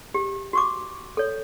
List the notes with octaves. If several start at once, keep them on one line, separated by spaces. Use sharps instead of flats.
G4
F#4 C#6 D6
A4 C#5